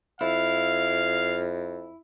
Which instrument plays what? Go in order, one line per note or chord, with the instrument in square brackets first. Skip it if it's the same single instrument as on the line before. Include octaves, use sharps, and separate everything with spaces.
[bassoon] F2 [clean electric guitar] E4 [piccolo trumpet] F5